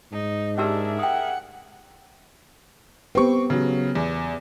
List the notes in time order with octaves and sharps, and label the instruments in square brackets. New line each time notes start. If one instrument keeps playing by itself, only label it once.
[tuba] G#2 [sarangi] D#4
[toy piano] C#4 G4 E6 [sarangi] D4 [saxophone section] G#4 A#4 E5
[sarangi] F#5 [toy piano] G5 D#6
[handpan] B3 G4 B4 [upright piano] C4 C#6
[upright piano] C#3 F#3
E2